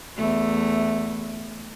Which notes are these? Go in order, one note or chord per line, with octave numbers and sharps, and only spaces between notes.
E2 A3